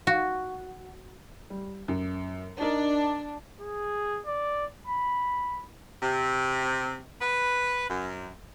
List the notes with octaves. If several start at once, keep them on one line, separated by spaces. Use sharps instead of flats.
F#4
G3
F#2
D4 D#4 A#4
G#4
D5
B5
C3
B4
F#2